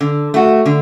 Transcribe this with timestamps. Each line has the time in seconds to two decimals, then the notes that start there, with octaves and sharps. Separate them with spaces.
0.01 D3
0.34 A3 F#4
0.66 D3